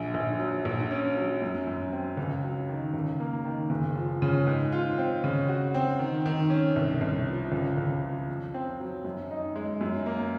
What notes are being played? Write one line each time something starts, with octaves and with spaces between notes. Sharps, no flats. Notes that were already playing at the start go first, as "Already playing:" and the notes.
Already playing: A#1
A#1
F#3
A#1
C#4
F#3
F#2
F#2
C4
C#2
F#3
D#3
C#2
A#3
D#3
F#1
F3
C#3
G#2
F4
C4
C#3
F#4
C4
D#3
D#3
C#4
C2
C2
F3
C#2
C#2
F3
F2
C4
F#3
F#2
D#4
G#3
F#2
A#3